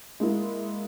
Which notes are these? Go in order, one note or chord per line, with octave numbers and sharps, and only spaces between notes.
G#3 A#3 E4